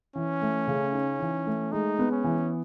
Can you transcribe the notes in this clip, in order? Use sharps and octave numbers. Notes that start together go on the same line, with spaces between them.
E3 C#4
A3
C#3
D#4
E3
A3
G#3 D#4
B3
C#4
E3